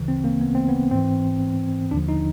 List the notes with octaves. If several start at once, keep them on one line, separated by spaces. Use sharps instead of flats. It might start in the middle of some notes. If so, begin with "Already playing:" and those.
Already playing: D2 C#3 E3
C4
A#3
B3
C4
B3
G#2 E3 C4
D#2 D3 F3 D4
D#4